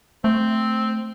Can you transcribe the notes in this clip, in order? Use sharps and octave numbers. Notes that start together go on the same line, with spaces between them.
A3 C4